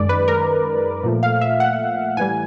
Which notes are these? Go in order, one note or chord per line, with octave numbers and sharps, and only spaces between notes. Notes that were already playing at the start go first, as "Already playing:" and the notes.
Already playing: F#2 D#3 G#3 D5
B4
A#4
A#2 F3 A3
F5
E5
F#5
A2 E3 G3 G#5